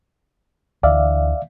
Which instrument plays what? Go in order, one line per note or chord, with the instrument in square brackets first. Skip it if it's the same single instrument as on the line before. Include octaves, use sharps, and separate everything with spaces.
[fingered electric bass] D2 D3 E3 [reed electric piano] D5 E5 F5